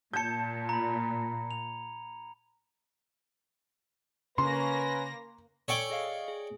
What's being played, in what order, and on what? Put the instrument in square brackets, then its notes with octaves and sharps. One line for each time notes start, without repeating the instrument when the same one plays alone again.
[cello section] A#2 [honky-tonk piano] A5 G6 [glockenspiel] G#6 C#7
[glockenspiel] A#5 B5
F7
[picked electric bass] C#3 [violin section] A#3 A#6 [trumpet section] C#4 B4 [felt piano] C6
[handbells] A4 G#5 E6 [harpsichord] C#5 D5 G5
[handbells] G#4 D#5 F5
G#4